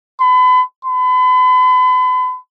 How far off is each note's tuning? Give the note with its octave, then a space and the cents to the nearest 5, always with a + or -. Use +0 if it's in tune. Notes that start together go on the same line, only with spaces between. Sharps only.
B5 +35
B5 +40